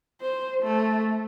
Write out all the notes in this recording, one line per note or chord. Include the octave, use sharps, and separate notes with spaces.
C5
A3